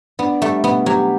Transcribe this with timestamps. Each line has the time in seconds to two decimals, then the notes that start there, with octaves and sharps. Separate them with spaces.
0.19 B3 D4
0.42 G3 A3
0.64 B2 B3
0.86 F#3 G4